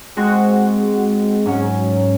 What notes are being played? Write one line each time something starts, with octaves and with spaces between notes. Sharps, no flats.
G#3 C4 F#4
G#2 F#3 C#4